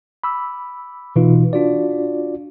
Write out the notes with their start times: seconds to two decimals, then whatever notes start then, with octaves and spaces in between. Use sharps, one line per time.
0.24 B5 D6 E6
1.16 B2 E3 D#4 F4 B4
1.53 D4 F4 F#4 D5